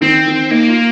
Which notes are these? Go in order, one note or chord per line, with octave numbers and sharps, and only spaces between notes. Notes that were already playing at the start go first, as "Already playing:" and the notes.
D#3 C4
D#3
A#3 D#4
F4